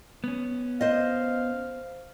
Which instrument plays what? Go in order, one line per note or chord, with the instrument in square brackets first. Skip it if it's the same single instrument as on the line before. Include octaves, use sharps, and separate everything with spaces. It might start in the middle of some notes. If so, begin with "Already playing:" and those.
[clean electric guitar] B3 C#4
[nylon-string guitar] C5 D#5 [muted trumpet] F5